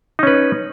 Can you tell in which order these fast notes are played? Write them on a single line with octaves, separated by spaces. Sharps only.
D#4 C#4 B4